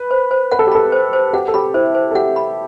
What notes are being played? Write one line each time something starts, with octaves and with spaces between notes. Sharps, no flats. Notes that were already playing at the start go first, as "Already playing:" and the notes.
Already playing: B4
C5
C5
B4 F#5
A4
G4
A4 B5
C5
C5
G4 F#5
A4
G4 B5
E4 C5
C5
A4
G4 F#5
B5